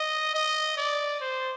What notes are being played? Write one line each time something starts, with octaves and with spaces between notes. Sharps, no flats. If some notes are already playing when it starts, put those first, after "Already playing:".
Already playing: D#5
D#5
D5
C5